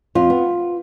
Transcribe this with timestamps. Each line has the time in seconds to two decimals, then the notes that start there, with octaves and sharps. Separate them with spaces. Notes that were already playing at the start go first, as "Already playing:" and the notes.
0.15 F2 F4
0.30 B3